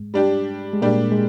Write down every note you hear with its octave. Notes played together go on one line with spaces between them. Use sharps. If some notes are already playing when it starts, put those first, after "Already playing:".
Already playing: G#2 G#3
G3 D4 G4
G#3
A#2 G3 A#3 D4 G4
G#3